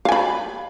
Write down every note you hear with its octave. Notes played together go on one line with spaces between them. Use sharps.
F5 G#5 B5